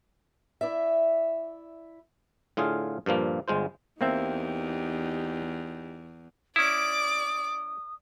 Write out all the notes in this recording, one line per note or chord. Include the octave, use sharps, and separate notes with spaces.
E4 D5 E5
A2 D3 F4 G#4 F5
G2 A#2 F3 A#3
G1 G#3 F4 C5
E2 A#3 C4 D#4 G4 E5
C#4 E4 D5 D6 D#6